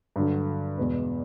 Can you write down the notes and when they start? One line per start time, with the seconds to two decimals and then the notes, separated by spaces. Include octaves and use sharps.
0.16 G2 D3 F#3
0.78 E2 B2 G#3 B3